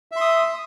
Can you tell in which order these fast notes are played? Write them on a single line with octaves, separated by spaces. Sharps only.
E5 C6 D#6